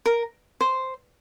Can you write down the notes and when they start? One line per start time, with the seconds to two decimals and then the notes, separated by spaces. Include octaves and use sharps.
0.06 A#4
0.61 C5